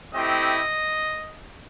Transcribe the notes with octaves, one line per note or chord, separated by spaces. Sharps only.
A3 C4 E4 G4 D#5